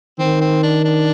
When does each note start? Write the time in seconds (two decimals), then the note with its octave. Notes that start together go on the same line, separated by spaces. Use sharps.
0.19 D#3 C4
0.41 C4
0.63 D4
0.85 D4